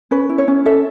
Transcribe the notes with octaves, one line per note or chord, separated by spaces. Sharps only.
C#4 B4
E4
C#5
C#4
A4 E5